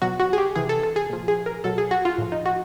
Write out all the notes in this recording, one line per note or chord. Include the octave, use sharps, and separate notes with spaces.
B2 F#3 F#4
F#4
G#4
G4
C3 E3 G#4
A4
A4
G#4
A#2 F3
G#4
A#4
B2 F#3 A4
G#4
F#4
F4
A2 F3
D#4
F#4